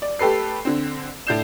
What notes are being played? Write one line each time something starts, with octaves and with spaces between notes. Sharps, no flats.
D5
A3 G4 A4 B4 C7
D3 C4
A2 D4 G6 C7 E7